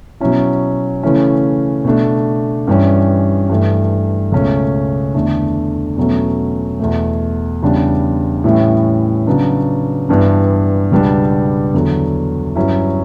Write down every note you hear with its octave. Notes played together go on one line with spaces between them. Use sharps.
B2 F#3 C#4 E4
C#3 E3 A3 C#4 E4
B2 A3 D4
G2 E3 G3 C#4
G2 E3 A3
C#2 B2 A3 C#4
E2 D3 A3 D4
E2 B2 F#3 A3 C#4
E2 B2 A3
E2 C#3 G3 D4
A2 E3 G3 C#4 E4
C#3 F#3 B3 D4
G2 E3 B3 D4
C#2 B2 G3 B3 D4
E2 D3 F#3
G2 F#3 C#4 E4